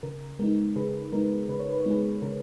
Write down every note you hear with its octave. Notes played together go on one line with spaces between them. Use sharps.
C#3 A#4
G#3 B3 D#4 A#4
C#3 G#4 B4
G#3 B3 D#4 A#4
C#3 B4
C#5
B4
C#5
G#3 B3 D#4 G#4 B4
C#3 A#4